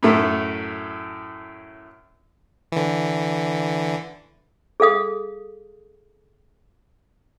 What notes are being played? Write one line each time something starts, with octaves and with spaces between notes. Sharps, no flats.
F#2 A2 A3
D3 E3
G#4 A4 F5 D#6